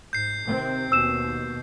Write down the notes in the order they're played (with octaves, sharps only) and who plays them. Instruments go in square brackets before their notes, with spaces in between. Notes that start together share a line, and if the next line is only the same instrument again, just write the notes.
[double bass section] G#2 [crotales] G6 C7
[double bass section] C3 D#3 C4
[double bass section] D#2 B2 [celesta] E6 E7